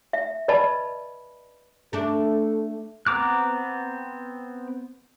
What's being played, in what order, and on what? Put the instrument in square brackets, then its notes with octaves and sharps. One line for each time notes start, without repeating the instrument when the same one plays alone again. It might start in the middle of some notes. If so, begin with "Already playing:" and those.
[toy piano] E5
B4 D5 D#5 A5 B5
[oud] A3 D4 [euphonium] A4
[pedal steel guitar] B3 C4 A#5 D6 F#6